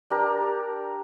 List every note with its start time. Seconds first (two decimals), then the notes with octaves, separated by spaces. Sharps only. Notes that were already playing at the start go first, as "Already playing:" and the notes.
0.10 D4 G4 A#4 A#5